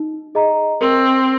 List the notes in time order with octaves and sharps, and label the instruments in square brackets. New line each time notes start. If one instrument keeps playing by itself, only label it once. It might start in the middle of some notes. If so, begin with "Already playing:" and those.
Already playing: [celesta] D#4
G#4 D#5 A#5
[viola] C4 [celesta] A#4